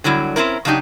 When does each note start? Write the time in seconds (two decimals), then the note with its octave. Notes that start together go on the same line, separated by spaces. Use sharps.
0.04 D3 F#3 G3 E4
0.36 C4 C#4 E4 A#4
0.65 C#3 F#3 D4 D#4 G4